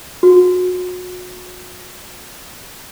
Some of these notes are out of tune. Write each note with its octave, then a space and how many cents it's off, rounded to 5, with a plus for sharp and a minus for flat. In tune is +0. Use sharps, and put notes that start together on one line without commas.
F#4 -35